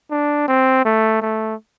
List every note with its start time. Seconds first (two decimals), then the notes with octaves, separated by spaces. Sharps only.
0.11 D4
0.48 C4
0.85 A3
1.22 A3